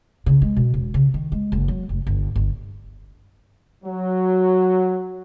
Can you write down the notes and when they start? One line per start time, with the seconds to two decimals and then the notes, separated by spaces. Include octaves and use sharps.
0.26 C#3
0.42 G#3
0.57 B2
0.74 E1
0.94 C#3
1.14 D#3
1.32 G#3
1.52 F#1
1.68 F#3
1.89 F1
2.07 G1
2.36 G1
3.84 F#3